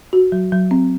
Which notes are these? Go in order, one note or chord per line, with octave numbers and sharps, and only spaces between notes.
F#4
F#3
F#3
C4